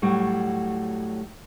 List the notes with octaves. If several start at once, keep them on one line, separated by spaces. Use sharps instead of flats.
A2 F#3 G3 F#4